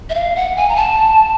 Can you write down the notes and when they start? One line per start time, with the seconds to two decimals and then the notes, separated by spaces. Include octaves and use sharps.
0.10 E5
0.14 F5
0.35 F#5
0.56 G#5
0.69 A#5
0.76 A5